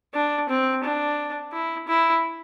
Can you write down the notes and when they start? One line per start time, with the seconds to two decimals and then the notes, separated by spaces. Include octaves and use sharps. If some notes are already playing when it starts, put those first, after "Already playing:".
0.15 D4
0.49 C4
0.84 D4
1.53 E4
1.88 E4